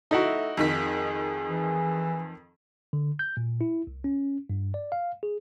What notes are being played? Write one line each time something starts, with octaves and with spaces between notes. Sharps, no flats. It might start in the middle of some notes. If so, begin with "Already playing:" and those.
A3 D#4 E4 F#4
F2 D#3 G#4 B6
E3
D3
G6
A#2
E4
C2
C#4
G2
D5
F5
G#4